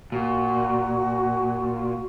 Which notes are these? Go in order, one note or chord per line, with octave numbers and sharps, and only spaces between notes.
A#2 F#4